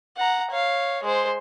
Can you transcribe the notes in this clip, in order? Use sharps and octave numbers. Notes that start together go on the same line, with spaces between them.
F#5 A#5
C#5 F5
G#3 C5